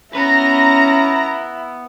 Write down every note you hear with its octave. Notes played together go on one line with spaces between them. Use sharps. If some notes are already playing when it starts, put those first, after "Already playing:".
B3 C#4 E4 B4 A#5